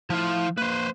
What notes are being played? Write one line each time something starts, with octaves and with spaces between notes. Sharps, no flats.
F3 E4 F4 A5
F3 A#3 B4 C5